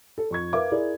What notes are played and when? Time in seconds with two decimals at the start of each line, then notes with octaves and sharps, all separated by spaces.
0.18 A4
0.31 F2 C#6 G#6
0.53 A#4 B4 E5 F5 D6
0.72 E4 G#4 A#4 D5